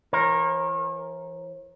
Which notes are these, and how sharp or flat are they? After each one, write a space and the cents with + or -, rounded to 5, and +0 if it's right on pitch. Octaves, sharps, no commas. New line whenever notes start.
E3 +25 A#4 +0 C#5 -40